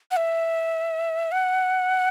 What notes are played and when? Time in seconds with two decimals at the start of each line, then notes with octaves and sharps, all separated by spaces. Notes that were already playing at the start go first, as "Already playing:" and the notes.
0.11 F#5
0.17 E5
1.32 F#5